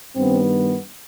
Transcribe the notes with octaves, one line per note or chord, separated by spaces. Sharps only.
G2 D#3 B3 C4